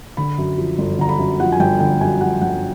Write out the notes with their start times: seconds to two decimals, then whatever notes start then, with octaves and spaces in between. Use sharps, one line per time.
0.17 D3 B5
0.38 F#2
0.58 F3
0.78 G1
0.99 D3 A#5
1.09 B5
1.19 F#2
1.40 F3 F#5
1.52 G#5
1.60 G1 G5
1.80 D3 G5
2.01 F#2 G#5
2.21 F3 F#5
2.41 G1 F#5